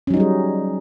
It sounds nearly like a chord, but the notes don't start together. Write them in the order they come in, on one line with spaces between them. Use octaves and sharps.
C#4 F#3 D#4 G3 G#4